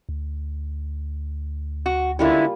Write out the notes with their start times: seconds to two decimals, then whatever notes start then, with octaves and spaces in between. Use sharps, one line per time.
0.09 D2
1.86 F#4
2.19 D3 G3 G#3 A#3 C#4 E4 F4